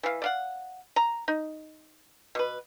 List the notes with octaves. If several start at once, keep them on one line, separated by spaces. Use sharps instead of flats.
E3 F5
D5 F5 F#5
A#5
D#4
B2 B4